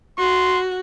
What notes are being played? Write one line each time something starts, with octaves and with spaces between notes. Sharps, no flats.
F#4 C6